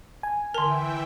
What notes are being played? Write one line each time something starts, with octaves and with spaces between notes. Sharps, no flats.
G#5
D3 E3 A#4 E5 G5 A5 C6